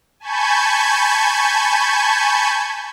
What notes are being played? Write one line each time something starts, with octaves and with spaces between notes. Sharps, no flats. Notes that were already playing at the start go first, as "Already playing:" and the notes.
G#5 A5 B5 C#6 G6 G#6